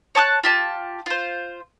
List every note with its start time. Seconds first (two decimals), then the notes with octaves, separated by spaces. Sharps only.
0.15 C#5 A5 D6 F#6
0.44 F4 G4 A5
1.06 F4 C5